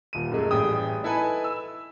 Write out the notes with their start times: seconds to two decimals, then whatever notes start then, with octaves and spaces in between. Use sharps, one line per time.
0.13 D#1 D#7
0.31 F#2 G#3 A3
0.51 A1 G3 G#4 G5 D#6
1.03 D#4 E4 A4 B4 E5 G#5
1.44 E6